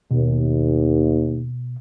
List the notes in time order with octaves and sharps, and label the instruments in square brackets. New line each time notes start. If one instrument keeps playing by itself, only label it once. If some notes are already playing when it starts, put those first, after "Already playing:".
[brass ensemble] D#2 [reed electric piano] B2